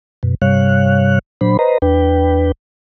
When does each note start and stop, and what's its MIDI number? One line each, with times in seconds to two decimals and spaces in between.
0.23 0.34 42
0.23 0.34 47
0.42 1.19 43
0.42 1.19 48
0.42 1.19 55
0.42 1.19 73
0.42 1.19 77
0.42 1.19 90
1.41 1.57 46
1.41 1.57 54
1.41 1.57 62
1.41 1.57 72
1.41 1.57 83
1.59 1.78 71
1.59 1.78 72
1.59 1.78 75
1.59 1.78 82
1.82 2.52 40
1.82 2.52 62
1.82 2.52 71
1.82 2.52 79